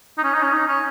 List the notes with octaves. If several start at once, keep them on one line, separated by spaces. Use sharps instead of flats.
D#4
C#4
D#4
C#4
D#4
C#4